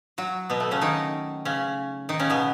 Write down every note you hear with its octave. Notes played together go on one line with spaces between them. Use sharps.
F#3 F#4
B2 B3
A3
C#3 C#4
D#3 D#4
C#3 C#4
D#3 D#4
C#3 C#4
B2 B3